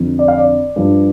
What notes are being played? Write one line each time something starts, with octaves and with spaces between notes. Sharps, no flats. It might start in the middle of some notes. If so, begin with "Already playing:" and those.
Already playing: F2 D3 F3
D5
F5
D5
G2 F3